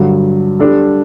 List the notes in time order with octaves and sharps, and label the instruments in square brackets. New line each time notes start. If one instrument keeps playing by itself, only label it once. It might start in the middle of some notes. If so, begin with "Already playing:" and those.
Already playing: [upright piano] G2 D3 F#3
G3 D4 A4